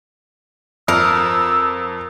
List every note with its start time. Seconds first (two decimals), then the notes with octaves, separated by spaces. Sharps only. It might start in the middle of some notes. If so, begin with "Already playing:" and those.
0.88 F2 A#4 E6